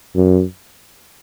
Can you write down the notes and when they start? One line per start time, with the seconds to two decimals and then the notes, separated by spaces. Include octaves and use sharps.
0.16 F#2